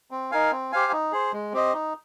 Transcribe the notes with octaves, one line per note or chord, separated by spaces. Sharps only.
C4
D#4 A#4 F5 G#5
C4
G4 C5 F5 G#5
D#4
G#4 C5
G#3
C4 G4 C5 D#5
D#4